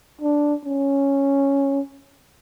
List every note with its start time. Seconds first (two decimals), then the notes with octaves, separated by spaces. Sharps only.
0.21 D4
0.65 C#4